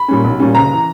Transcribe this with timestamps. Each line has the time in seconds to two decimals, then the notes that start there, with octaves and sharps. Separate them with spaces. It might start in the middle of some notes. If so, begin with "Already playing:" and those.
Already playing: B5
0.08 A#2 G3 C#4
0.24 B1
0.40 A#2 G3 C#4
0.55 F#1 A#5
0.73 E3